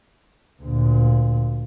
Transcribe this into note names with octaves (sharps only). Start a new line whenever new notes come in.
D2 A#2